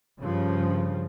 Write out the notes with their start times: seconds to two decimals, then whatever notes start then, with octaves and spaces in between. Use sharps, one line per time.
0.21 G2 C#3 F3